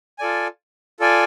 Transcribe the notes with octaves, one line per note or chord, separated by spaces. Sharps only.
F4 A4 D5 G#5
F4 A4 D5 G#5